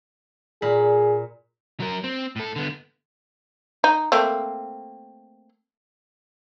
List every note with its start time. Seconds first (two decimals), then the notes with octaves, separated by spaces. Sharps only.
0.62 A#2 G#4 B5
1.80 F#3 A#4
2.04 C4
2.36 A2 A4
2.56 D3 B3
3.84 D#4
4.12 A3 A#3 C4